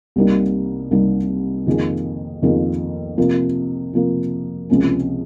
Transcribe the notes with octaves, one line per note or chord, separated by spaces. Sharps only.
C2 C3 G3 A#3 D#4
C2 C3 G3 A#3 D#4
F2 D#3 A#3 F4 G#4
F2 D#3 A#3 F4 G#4
C3 F3 A#3
C3 F3 A#3
C#2 C3 F3 A#3 C#4